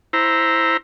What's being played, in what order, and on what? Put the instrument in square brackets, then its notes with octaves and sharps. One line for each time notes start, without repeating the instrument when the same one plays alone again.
[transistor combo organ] E4 C5 A#5